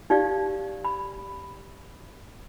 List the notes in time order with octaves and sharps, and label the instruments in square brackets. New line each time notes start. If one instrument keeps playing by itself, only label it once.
[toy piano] D#4 G4 D5 F5
B5